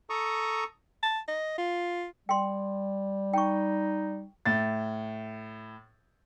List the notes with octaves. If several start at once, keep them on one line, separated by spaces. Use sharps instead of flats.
A4 A#5 C#6 D#6
A5
D#5
F4
G3 G5 C6
D#4 G5 C#6
A2 A6